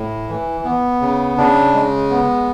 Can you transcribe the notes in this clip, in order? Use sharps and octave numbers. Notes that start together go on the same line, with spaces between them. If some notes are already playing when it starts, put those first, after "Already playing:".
Already playing: A2
E3
B3
C#3
C#3 D4
G#3
B3